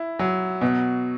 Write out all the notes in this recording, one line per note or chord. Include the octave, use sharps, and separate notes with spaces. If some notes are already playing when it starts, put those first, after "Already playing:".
Already playing: E4
F#3
B2